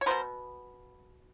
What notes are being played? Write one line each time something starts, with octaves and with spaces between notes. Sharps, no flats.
C#5
B2 F#3 B3 A#4 C5